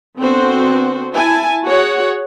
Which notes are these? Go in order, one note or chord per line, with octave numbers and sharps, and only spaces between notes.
D3 B3 C4 F#4 A4 C5
E4 G#5 A5
F#4 G#4 C#5 F#5